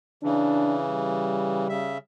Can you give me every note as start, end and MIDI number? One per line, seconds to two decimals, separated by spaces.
0.23 1.68 49
0.23 1.68 52
0.23 0.77 62
0.88 1.98 55
1.69 1.98 49
1.69 1.98 76